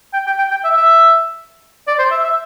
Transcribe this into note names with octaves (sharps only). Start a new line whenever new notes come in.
G5
G5
G5
G5
E5
E5
D5
C5
E5
E5